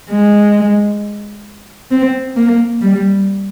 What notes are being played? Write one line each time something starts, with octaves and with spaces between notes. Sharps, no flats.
G#3
C4
A#3
G3